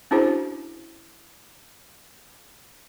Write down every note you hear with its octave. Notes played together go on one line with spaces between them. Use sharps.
C#4 D4 E4 F#4 G#4 C5